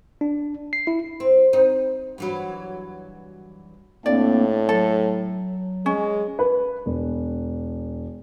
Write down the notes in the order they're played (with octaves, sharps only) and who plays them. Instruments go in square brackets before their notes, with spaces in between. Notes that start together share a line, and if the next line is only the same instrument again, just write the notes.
[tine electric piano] D4
C7
E4
[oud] C4
C4 D#4
G2 E3 F#3
[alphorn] A2 [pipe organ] A#3 C4 D4 [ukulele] D5
[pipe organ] F#3 [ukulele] A4
[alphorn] G#3 [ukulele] C#4
[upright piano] B4
E1